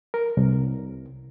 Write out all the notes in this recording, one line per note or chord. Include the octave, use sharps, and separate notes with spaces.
A#4
C2